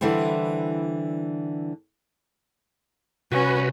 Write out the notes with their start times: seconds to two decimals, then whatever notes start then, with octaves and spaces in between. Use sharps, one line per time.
0.01 D3 E3 G3 E4 C5
3.32 C2 C#4 F#4 B4